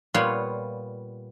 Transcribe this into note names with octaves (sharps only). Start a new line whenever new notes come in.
A#2 G3 B3 F4 C#5 F5